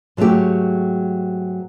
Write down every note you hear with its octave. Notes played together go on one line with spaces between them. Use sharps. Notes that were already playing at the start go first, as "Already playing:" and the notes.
G#2 F#3 G3 A3 G4